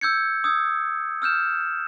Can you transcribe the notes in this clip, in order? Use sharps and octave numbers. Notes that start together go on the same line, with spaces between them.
E6 G6 G#6 C#7
D#6 E6 G#6
E6 F6 G6 E7